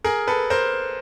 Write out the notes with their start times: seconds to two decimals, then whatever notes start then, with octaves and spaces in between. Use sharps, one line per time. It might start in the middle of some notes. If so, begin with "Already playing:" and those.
0.04 G#4 A#4
0.28 A4 B4
0.50 A#4 C5